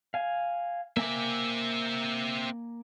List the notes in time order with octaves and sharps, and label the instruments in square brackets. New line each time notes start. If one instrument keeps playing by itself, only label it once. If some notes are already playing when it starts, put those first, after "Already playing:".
[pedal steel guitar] F5 G#5
[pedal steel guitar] A#3 G#5 D6 [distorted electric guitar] C4 E5